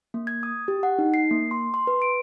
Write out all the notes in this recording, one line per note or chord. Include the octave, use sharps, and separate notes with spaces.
A#3
G#6
D#6
G4
F#5
D#4
C7
A#3
C6
C6
B4
D7